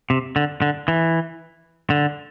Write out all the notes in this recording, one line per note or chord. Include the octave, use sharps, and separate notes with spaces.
C3
D3
D3
E3
D3